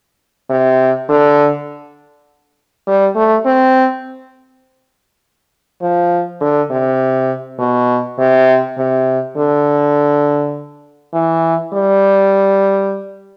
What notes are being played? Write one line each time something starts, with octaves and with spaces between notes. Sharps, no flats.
C3
D3
G3
A3
C4
F3
D3
C3
B2
C3
C3
D3
E3
G3